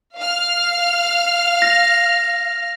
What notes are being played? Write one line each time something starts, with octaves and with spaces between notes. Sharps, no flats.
F5 F6
A#6